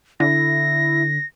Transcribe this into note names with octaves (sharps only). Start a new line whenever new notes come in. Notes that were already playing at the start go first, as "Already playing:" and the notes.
D3 E4 A#6